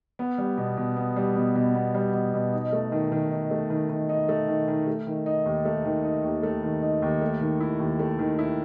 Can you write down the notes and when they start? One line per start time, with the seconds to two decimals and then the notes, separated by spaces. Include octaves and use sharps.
0.19 B3
0.38 G3
0.58 B2
0.77 B2
0.97 B3
1.16 G3
1.36 B2
1.55 B2
1.75 B3
1.94 G3
2.14 B2
2.34 B2
2.53 D#4
2.73 A3
2.92 D#3
3.12 D#3
3.31 D#4
3.51 A3
3.70 D#3
3.89 D#3
4.09 D#4
4.29 A3
4.48 D#3
4.68 D#3
4.87 A3
5.07 D#3
5.26 D#4
5.46 D#2
5.65 A3
5.85 D#3
6.04 D#4
6.24 D#2
6.43 A3
6.63 D#3
6.82 D#4
7.02 D#2
7.21 A3
7.41 D#3
7.61 E4
7.80 D#2
7.99 A3
8.19 D#3
8.39 E4